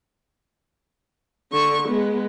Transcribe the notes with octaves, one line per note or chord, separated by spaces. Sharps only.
D3 C#6
G#3 B3